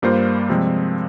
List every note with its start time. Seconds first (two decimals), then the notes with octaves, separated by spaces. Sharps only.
0.02 G2 G3 A#3 F4 C5
0.49 C3 F3 G#3 C4